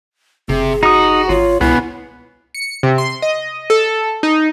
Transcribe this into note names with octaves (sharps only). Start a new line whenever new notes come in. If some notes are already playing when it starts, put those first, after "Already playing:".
F#1 C3 G#4
D#4 F#4 D#6
G#1 F4 C#5
C#2 B2 B3 E4 G#4
C#7
C3
C6
D#5
A4
D#4